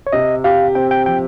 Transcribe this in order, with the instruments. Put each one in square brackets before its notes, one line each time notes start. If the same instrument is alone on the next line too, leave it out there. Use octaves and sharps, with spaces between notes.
[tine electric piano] C#5
[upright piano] C3 [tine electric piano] D#5
[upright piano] G4 [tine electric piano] F5
[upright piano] C4 [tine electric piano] G5
[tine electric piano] G5
[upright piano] F3 [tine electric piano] G5